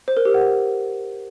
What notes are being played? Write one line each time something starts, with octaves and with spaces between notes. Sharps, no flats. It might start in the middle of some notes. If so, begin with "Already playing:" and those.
C5
A#4
G4
F#5